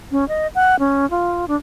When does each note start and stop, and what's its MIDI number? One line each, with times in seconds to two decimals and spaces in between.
0.11 0.27 61
0.28 0.47 75
0.55 0.78 78
0.79 1.08 61
1.10 1.45 65
1.48 1.55 62